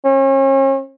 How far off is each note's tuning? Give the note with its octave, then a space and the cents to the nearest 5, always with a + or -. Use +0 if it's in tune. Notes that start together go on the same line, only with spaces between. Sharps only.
C#4 -40